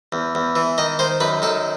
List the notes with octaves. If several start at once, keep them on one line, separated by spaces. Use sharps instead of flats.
E2
E2
E3
D#3 D#5
D#3 C5
F#2 B4
D#3 A4